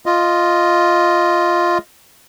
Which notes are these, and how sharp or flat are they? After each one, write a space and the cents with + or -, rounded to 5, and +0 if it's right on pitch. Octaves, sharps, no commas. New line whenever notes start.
F4 +0 D#5 +0